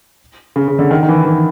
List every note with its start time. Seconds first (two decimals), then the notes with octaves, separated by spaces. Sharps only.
0.56 C#3
0.68 C#3
0.79 D3
0.91 D#3
1.03 D#3
1.09 E3
1.25 E3